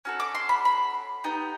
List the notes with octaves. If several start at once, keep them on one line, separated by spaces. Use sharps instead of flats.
C#4 F#4 A4
D6
C6
B5
B5
B3 D#4 G4